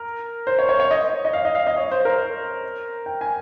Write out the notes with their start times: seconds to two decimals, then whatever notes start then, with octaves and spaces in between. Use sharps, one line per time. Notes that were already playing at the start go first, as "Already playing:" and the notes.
Already playing: A#4
0.47 C5
0.59 C#5
0.69 C#5
0.80 C#5
0.91 D#5
1.25 D#5
1.33 F5
1.45 D#5
1.55 F5
1.67 D#5
1.76 C#5
1.92 C5
2.05 A#4
3.06 G5
3.21 G#5